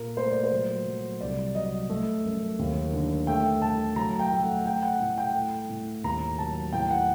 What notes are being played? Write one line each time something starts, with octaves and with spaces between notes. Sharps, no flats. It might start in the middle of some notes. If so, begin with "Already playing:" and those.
Already playing: A#2 A#4
A3 C5
D5
C5
F#3
F#3
C2 D5
F#3 D#5
A3
F#2
D#2
D3
A3 G5
A3 A5
F#3 A#5
G5
A3
F#5
A3 G5
F#5
A2
G5
A3
A2
D#2 A#5
F#3 A5
A2 G5
F#5